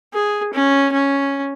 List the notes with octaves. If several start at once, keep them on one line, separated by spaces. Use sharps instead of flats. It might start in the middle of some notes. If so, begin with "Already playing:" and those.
G#4
C#4
C#4